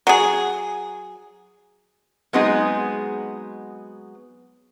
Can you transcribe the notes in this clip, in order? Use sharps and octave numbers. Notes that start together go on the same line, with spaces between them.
F#3 G#4
F#3 G#3 B3 C4 D#4 G#4